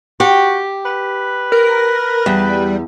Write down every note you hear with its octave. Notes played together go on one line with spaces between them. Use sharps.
F#4 G4
B4
A#4
E2 G3